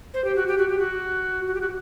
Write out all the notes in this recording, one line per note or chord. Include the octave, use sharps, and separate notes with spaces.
C5
G4
F#4
G4
F#4
G4
F#4
F#4
G4
F#4